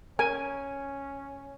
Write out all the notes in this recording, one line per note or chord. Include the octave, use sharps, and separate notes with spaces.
C#4 A#4 G#5